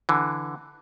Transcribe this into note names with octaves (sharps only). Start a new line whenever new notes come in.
D3 E3